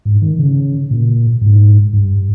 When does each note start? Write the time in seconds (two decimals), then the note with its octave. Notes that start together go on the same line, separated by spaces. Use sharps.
0.05 G#2
0.22 D#3
0.39 C#3
0.91 A#2
1.41 G#2
1.93 G2